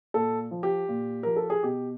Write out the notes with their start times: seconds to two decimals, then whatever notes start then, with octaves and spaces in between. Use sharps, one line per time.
0.14 A#2 A4
0.51 F3
0.63 G4
0.89 A#2
1.23 F3 A#4
1.36 A4
1.50 G#4
1.63 B2 G4